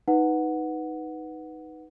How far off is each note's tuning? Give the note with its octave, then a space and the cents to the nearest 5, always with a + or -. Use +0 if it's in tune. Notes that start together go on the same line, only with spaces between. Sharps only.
D#4 +5 B4 +0 F#5 -5